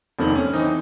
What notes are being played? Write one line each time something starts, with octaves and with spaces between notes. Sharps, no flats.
F1 F2 C3 D#3
C#4
E3 C4 D#4